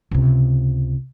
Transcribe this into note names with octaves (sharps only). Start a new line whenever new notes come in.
C#2 C3